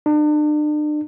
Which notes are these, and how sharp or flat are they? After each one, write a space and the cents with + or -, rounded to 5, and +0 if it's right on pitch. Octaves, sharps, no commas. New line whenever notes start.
D4 +40